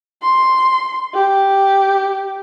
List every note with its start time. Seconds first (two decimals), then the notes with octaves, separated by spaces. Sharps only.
0.22 C6
1.14 G4